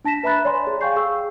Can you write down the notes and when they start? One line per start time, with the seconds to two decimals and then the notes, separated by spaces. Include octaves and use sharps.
0.05 D4 A5 A#6 B6 E7
0.23 B4 E5 A#5 B5 F#6 A6
0.45 C#5 D5 G#5 C6
0.67 G#4
0.81 F5 G5 G#5 C#6 G6 C7
0.96 G#4 C#6 E6